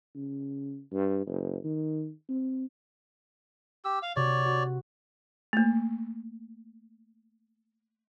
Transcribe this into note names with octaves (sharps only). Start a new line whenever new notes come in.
C#3
G2
F#1
D#3
C4
G4 E6
F5
C3 F#4 C#5 D5
F#4
A3 A#3